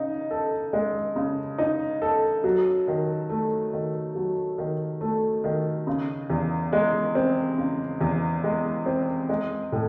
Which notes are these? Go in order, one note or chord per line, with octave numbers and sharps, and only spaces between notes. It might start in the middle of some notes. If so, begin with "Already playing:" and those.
Already playing: C#3 D#4
A4
G#3
C#3
D#4
A4
F#3
D#3
A3
D#3
F#3
D#3
A3
D#3
C#3
E2
G#3
C4
C#3
E2
G#3
C4
G#3
A2